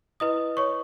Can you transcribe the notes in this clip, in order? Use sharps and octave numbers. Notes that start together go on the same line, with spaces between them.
E4 B4 D#5 D#6
C#5 C#6